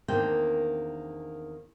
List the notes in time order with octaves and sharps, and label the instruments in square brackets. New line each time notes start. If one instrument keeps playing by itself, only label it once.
[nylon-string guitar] E2 D#3 A#3 C4 D4 G5